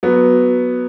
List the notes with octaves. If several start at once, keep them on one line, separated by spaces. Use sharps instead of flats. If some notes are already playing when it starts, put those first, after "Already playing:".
F#3 B3